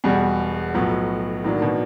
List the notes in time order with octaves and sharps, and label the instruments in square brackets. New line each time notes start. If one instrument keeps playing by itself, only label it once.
[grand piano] E1 E2 B2 [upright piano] G3
[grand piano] B1 A2 F#3 B3 [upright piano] F3
[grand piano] A2 F#3 A#3 D4 [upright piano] E3
[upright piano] D#3
B2